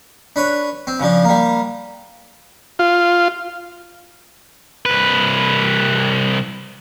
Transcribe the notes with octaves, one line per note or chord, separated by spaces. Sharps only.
D4 B4 C#5
C4
C#3 F3 D4
G3 A#3
F4
C2 B4